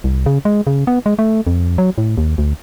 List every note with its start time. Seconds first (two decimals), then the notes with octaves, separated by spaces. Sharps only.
0.04 C2
0.26 C#3
0.45 G#3
0.67 C#3
0.87 B3
1.06 G#3
1.19 A3
1.47 F2
1.78 F#3
1.98 A2
2.18 D#2
2.38 D2